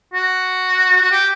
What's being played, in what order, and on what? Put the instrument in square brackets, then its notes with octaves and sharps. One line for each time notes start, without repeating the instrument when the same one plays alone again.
[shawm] F#4
F#4
G4